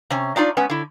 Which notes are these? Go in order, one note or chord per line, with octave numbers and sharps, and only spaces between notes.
C3 C#4
D4 D#4 F4 D5
G#3 B3 C#4
D3 E4